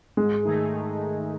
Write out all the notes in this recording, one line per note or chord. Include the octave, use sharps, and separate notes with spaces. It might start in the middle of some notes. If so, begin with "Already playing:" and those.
G#2 G#3
D#3 A3 D#4 G#4